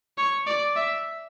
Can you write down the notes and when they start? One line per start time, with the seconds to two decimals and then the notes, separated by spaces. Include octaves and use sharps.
0.18 C#5
0.47 D5
0.76 E5